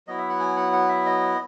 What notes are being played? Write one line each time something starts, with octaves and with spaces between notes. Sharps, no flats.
F#3 B3 E4 D#5
E5
F#5
G#5
F#5
F#5
E5
D#5